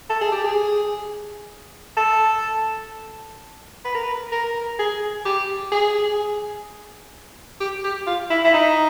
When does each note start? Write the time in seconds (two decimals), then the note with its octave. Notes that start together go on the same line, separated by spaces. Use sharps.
0.10 A4
0.21 G#4
0.32 G4
0.44 G#4
1.97 A4
3.85 B4
3.95 A#4
4.03 B4
4.32 A#4
4.79 G#4
5.25 G4
5.72 G#4
7.60 G4
7.84 G4
8.07 F4
8.30 E4
8.44 E4
8.53 D#4